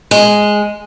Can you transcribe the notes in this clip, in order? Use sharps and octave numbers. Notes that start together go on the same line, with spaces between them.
G#3